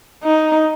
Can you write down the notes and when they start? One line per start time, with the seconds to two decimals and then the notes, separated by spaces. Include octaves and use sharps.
0.23 D#4